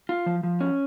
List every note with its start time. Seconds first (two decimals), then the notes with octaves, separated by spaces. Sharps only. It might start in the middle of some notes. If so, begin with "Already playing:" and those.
0.09 F4
0.26 F3
0.43 F3
0.61 C#4